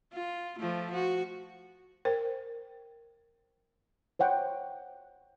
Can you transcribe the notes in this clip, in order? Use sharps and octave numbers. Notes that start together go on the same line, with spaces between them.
F4
F3 A3
F#4
A#4 C5 G5
C5 C#5 F#5 G5